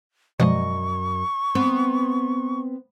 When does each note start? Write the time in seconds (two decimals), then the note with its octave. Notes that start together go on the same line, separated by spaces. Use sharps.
0.40 F#2 B2 F3 G#3 D#5 C#6
1.55 B3 C4